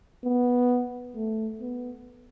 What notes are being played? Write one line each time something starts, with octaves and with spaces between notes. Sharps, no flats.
B3
A3
B3